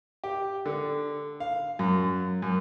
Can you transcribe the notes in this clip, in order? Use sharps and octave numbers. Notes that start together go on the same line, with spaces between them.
G4
D3
F5
F#2
F#2